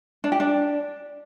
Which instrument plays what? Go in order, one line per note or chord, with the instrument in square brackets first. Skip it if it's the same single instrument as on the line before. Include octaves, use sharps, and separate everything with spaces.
[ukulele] D4
G4
D4